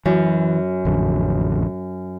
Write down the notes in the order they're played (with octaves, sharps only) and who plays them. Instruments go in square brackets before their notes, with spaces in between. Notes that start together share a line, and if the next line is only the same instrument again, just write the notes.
[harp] F#2 [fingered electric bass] E3
[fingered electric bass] A1 F2 D3